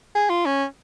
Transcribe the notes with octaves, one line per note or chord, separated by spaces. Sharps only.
G#4
F4
C#4